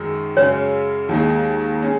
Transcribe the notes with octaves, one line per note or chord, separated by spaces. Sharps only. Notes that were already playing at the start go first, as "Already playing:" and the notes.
Already playing: F#2 D#3 G#3 D#4
F#2 C#3 G#3 C#4 C#5
D#2 D#3 G#3 D#4
G#3 C#4